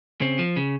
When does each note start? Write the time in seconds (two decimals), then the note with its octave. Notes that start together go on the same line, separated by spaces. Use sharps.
0.21 C#3 C4
0.39 F3
0.56 C#3